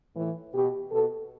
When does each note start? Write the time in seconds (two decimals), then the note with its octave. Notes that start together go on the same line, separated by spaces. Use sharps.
0.15 A2 E3
0.54 B2 G4
0.91 B2 A4